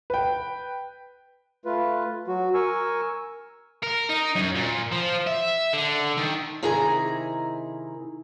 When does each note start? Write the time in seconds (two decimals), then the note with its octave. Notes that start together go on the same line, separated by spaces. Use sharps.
0.10 B4 G5
1.65 A3 F4 B4
2.27 F#3 F#4
2.54 A#4 G#5 C#6 E6
3.83 A#4
4.10 D#4
4.36 F#2
4.55 A#2
4.92 F3
5.27 E5
5.73 D3
6.18 D#3
6.63 C3 D#3 E4 G#4 G#5 A#5